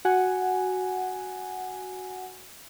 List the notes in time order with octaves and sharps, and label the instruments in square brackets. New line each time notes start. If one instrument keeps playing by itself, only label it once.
[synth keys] F#4 F#5 G#5